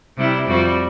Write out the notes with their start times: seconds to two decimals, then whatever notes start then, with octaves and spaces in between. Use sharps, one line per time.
0.17 C3 G3 E4
0.48 F2 G3 F#4